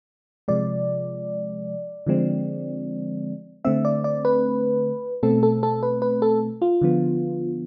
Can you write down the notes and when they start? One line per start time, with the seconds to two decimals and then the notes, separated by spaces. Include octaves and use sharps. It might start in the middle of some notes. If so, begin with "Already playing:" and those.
0.48 C3 F3 G#3 D5
2.07 D3 F3 G#3 C4
3.65 D3 A3 C4 E5
3.85 D5
4.04 D5
4.25 B4
5.23 B2 A3 C4 A4
5.43 A4
5.63 A4
5.83 B4
6.02 B4
6.22 A4
6.62 F4
6.81 D3 F3 B3